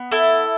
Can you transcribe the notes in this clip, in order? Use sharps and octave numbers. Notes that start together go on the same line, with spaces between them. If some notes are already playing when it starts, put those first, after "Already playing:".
Already playing: B3
E4 A4